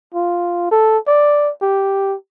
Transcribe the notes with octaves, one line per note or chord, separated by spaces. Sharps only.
F4
A4
D5
G4